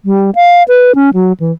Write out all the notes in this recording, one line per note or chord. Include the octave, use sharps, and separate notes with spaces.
G3
F5
B4
C#4
F#3
E3